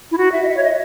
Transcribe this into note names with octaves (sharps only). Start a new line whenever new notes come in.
E4
F#4
E5
D#5
E5
C#5
D#5